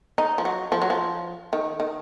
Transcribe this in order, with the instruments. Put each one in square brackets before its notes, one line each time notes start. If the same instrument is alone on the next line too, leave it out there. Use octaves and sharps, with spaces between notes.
[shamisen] D#4
F3
F#3
F3
F#3
F3
D#3
D#3